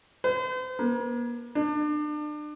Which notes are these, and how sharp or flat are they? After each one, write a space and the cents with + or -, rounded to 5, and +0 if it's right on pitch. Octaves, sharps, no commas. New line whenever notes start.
C5 -40
A#3 +40
D4 +35